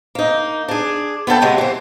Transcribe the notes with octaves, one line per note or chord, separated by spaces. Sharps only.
A#3 D#4
D4 G#4
B3 F4 A4 G5
C3 F#3 G#3 A#3
E3 C5